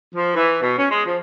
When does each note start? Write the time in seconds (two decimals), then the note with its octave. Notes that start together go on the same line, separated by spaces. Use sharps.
0.15 F3
0.35 E3
0.61 B2
0.77 C#4
0.91 G#3
1.06 F3